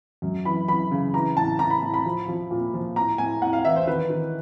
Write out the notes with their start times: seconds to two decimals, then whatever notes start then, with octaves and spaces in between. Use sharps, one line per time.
0.22 F#2
0.45 E3 B5
0.68 E3 B5
0.91 C#3
1.14 E3 A#5
1.37 A2 A5
1.59 A2 A#5
1.70 B5
1.82 A2
1.94 B5
2.05 F3
2.28 F3
2.51 A#2
2.74 F3
2.96 A2 A#5
3.18 A2 G#5
3.42 A2 F#5
3.53 F5
3.65 E3 E5
3.76 C5
3.87 D#3 B4
4.10 D#3